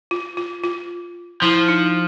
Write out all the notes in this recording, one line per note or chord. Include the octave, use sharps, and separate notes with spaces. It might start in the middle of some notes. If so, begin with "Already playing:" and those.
F4
F4
F4
F3 E4
D#4